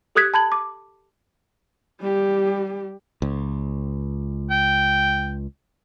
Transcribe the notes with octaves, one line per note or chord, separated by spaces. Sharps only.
G4 A4 D#6 F#6 G#6 B6
A5 B5 G#6 F#7
D6
G3 G4
C#2
G5